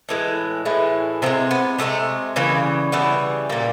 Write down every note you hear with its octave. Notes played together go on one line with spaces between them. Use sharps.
A2 E3 G#3
A2 E3 G#3
C3 F3 G#3 C4
B3
C3 F3 G#3 A3
C#3 E3 G3 A#3
C#3 E3 G3 B3
A#2 G3 A#3